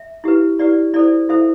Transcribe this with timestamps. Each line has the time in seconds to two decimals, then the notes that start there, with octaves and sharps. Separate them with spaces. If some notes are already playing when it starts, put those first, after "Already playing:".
Already playing: E5
0.24 E4 G4 B4
0.59 E4 G4 B4 D5
0.94 E4 A4 C5 D5
1.29 E4 A4 C5 E5